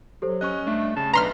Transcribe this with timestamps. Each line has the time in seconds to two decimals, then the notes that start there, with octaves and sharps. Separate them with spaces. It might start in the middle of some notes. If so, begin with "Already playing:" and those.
0.22 F#3 G4 A4 C5
0.41 C#4 D#5 C#6 F#6
0.67 G2 A3 D4
0.97 C#3 A5
1.13 B1 D4 B4 A#5 C6 F6 B6